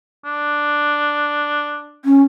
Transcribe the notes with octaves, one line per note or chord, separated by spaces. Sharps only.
D4
C#4